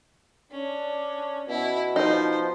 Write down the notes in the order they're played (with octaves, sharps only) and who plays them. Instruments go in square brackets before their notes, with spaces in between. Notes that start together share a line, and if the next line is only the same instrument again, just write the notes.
[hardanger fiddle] C#4 [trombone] D4
[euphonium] B2 [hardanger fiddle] E4
[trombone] F3 [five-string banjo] D#4 [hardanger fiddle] C5